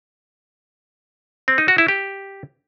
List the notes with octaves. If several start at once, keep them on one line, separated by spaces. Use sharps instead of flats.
C4
D#4
F#4
E4
G4